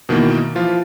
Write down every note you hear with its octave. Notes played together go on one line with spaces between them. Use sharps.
B2 D#3 E3 A#3
E3 F3 F4